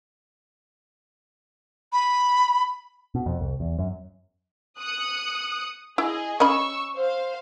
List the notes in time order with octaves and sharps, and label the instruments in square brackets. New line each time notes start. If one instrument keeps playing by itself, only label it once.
[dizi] B5
[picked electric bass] B2
F2
C2
E2
F#2
[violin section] D#6 F#6 C#7
[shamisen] E4 [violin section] G#4 D#5
[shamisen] C#4 D#5 B5 [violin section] C#6 E6
[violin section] C5 F5